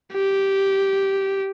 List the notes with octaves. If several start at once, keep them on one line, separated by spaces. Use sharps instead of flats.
G4